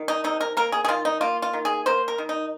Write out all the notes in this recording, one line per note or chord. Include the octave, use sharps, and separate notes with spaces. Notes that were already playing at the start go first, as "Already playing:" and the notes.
Already playing: D#3
D#4
C3 D#4
A#4
A#3 A#4
G#4
G#4
D#3 F4
D#4
A#3 F4
F4
D#3
G#4
A#3 C5
A#4
D#3
D#4